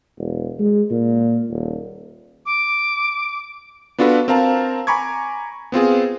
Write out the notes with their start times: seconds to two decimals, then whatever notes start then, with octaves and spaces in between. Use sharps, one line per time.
0.19 E1
0.59 G#3
0.91 A#2
1.50 D#1
2.46 D6
3.98 B3 D4 F4 F#4 A4 B4
4.28 C4 A#4 F5 A5 A#5
4.87 G#5 A#5 B5 C#6 D6 G#6
5.72 B3 C4 F4 G#4